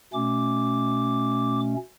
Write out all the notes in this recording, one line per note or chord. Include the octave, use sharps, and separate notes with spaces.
B2 A3 C#4 D6